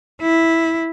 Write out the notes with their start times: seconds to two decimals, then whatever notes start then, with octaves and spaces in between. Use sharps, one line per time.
0.22 E4